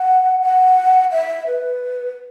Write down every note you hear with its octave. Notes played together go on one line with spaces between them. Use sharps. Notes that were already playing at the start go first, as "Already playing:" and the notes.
Already playing: F#5
F#5
E5
B4